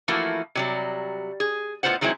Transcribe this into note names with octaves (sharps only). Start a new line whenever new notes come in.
E3 F3 A3 A#3 E4 F#4
C3 F#3 G3
G#4
A2 A#3 B3 F4 C5 F#5
D#3 F#3 G#3 C4 E4